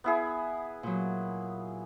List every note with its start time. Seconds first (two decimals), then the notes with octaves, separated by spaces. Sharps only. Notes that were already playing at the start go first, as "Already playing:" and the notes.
0.04 B3 E4 G#4
0.83 A#2 F#3